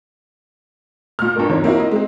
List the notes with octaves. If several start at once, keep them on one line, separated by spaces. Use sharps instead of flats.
A#2 F6
G2 A#2 A#4
B1 E2 D#3 C4 C#5
A#3 C4 E4 F#4
E4 D#5
G#3 C4